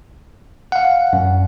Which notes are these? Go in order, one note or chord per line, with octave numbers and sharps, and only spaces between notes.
F5 F#5
F#2